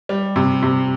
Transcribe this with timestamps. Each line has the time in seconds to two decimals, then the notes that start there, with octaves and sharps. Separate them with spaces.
0.09 G3
0.36 C3
0.63 C3